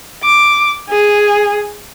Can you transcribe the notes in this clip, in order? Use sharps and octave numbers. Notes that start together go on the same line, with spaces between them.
D6
G#4